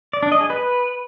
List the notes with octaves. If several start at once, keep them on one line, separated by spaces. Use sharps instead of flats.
D5
D4
D#5
G#4
B4